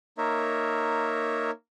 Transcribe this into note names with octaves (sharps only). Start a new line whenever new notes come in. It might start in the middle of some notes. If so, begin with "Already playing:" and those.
A#3 D#4 A#4 C#5 E5